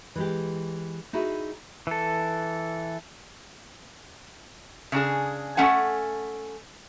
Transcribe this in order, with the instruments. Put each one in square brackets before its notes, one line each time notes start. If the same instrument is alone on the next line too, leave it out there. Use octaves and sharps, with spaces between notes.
[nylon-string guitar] E3 G#3 G4
D#4 E4 F#4 G#4
[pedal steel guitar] E3 A4
[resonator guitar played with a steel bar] C#3 D4 G#4
A3 C#4 F#5 G#5